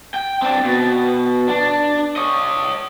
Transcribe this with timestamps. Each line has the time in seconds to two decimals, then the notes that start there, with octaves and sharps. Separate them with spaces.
0.14 G5
0.42 C4 D4
0.65 B2
1.48 D4
2.16 C#5 D#5